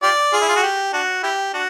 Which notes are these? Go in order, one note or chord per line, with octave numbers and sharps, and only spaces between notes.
F4 G4 D5
F4 G#4
E4
F4
F#4
G4
D4 F#4
E4 G4
D4 F#4